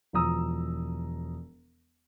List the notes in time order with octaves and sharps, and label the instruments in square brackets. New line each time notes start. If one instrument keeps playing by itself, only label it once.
[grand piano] E1 F3 A#5 D#6 E6